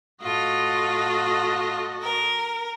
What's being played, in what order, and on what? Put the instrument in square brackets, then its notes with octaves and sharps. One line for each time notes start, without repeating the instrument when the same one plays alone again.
[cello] A2 A4 [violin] F4 [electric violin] F#4 D#5
[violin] A#4